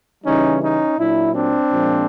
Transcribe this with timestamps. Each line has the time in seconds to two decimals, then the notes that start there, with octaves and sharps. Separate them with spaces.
0.24 C#3 E3 G3 C#4 D#4
0.61 C#4 D#4
0.97 A#2 F#3 D4 E4
1.33 C4 D4
1.70 A#2 F3 G#3